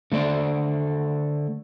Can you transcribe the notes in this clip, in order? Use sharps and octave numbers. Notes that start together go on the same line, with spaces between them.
D3 A3 C5 D5